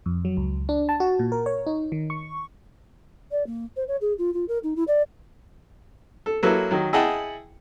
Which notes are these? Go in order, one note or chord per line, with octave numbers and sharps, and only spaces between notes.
F2
F#3
C#2
D4
A5
F#4
A#2
A#4
C#5
D#4
D#3
C#6
D5
A#3
C5
C#5
G#4
F4
F4
A#4
D#4
E4
D5
A4
F#3 A#3 E4 A4 B4
D#3 F#3
E4 G#4 D#5 F#5 G5 A5